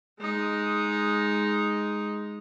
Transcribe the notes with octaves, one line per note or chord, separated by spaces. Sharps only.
G#3 D#4